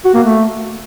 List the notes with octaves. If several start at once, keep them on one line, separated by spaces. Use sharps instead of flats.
F#4
A#3
A3